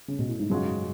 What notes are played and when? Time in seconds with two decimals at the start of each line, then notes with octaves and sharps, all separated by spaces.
0.08 C#3
0.19 B2
0.28 A2
0.40 G#2
0.50 F#2 C#3 G#3 C#4 F#4